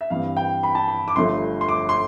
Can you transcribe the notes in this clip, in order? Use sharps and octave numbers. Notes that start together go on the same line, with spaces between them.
E5
G2 E3 G3 C4 F5
G5
B5
A5
B5
D6
G1 G2 F3 A3 C6
C6
D6
C6